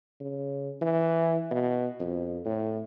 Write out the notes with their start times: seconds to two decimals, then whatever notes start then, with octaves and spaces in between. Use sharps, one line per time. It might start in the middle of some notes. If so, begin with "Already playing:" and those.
0.20 C#3
0.82 E3
1.51 B2
2.00 F2
2.45 A2